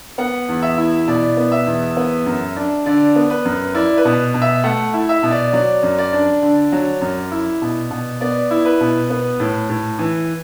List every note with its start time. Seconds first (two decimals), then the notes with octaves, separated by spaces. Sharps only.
0.18 B3 F#5
0.49 E2
0.62 E5
0.77 E4
1.08 B2 D5
1.37 B3
1.52 E5
1.66 E2
1.97 B3
2.26 F#2
2.56 D4
2.86 D3 D5
3.16 B3
3.30 B4
3.45 F#2
3.74 E4 D5
3.97 B4
4.05 B2
4.34 B2
4.42 E5
4.64 A3 F#5
4.94 E4
5.09 E5
5.23 B2
5.31 D5
5.53 F#3 D5
5.83 F#2
5.98 D5
6.13 D4
6.43 D3
6.72 F#3
7.01 F#2
7.32 E4
7.62 B2
7.91 B2
8.21 B3 D5
8.51 E4
8.65 B4
8.80 B2
9.10 B3
9.40 A2
9.69 A2
9.99 E3